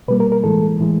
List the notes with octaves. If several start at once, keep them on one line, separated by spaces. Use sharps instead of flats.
B2 G3 A#3 B4
A#4
A#4
A2 E3 G#3 A4
A2 E3 G#3